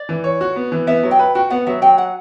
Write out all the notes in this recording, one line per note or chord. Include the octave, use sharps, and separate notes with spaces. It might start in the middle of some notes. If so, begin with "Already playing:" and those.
Already playing: D5
E3
C#5
F#4
B3
E3
B3 E5
F#3
G5
B4
F#4 G5
B3 F#5
F#3 E5
F#3 G5
F#5